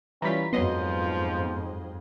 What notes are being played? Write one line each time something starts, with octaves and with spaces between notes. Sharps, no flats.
E3 G3 C#4 F4 A#5 B5 B6
F2 G#2 F3 F#3 B3 D#5 C6